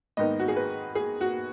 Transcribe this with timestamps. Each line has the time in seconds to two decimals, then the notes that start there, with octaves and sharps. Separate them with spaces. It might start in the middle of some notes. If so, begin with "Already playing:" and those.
0.17 G#2 D#3 B3 D#4 D#5
0.40 F#4
0.48 G#4
0.56 B4
0.95 G#4
1.21 F#4